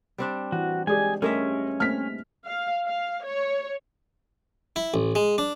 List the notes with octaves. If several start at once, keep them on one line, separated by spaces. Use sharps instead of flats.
G3 C4 D4
E3 F#4
G#3 G4 G#4 D5 G#5
G2 G#3 A3 C#4 G4 A4 A#4 E5
A3 A#3 C4 F6 B6
F5
F5
C#5
E4
A1
G#3
D4